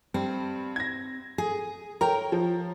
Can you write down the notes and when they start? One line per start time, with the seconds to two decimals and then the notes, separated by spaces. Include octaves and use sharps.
0.14 G2 C4
0.76 G#6 A#6
1.38 G#4
2.01 A#4 C#5 G5 A#5
2.32 F3